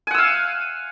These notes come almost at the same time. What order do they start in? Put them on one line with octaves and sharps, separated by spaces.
G#5 F#5 E6 F5